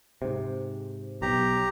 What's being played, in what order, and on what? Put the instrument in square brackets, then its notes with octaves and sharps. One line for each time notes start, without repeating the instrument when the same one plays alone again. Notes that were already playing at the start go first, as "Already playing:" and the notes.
[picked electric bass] G#2 C3
[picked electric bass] B1 [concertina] G4 A#5